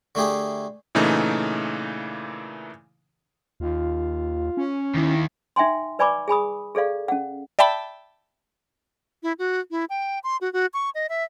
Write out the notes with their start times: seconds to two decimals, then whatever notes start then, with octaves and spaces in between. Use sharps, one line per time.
0.15 D3 A3 E4 G4 G#4
0.95 A#2 C#3 E3 A3 D#4
3.60 D#2 F4
4.57 C#4
4.95 D#2 D#3 E4
5.56 D#4 E5 G5 G#5 C6
5.99 B4 D5 G#5 B5 C#6 D6
6.28 G#4 G#5 B5 D#6
6.75 G#4 A4 D5 F5
7.08 C#4 F#5
7.59 D5 E5 G5 A5 B5
9.23 E4
9.39 F#4
9.71 E4
9.90 G5
10.24 C6
10.41 F#4
10.53 F#4
10.74 C#6
10.95 D#5
11.09 E5